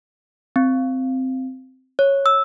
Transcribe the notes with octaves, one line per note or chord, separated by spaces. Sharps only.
C4
C#5
E6